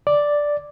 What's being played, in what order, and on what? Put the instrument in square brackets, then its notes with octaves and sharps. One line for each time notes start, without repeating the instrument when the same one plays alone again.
[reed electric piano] D5